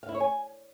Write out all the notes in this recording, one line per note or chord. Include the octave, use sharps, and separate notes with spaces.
F5
E4
C#5
G#5